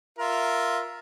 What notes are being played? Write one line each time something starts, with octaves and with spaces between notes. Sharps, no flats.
F4 A#4 E5